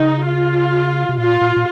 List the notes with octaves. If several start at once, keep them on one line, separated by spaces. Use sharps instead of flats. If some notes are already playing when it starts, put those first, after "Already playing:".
Already playing: C#3 D#4
F4
C3
A#2 F4
A#2
A#2